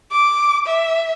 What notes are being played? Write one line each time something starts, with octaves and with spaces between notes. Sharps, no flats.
D6
E5